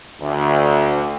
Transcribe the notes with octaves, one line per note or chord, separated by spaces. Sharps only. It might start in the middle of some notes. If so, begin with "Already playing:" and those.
D2